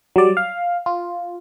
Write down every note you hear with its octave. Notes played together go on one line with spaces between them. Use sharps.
F#3 G3 D5
F5
F4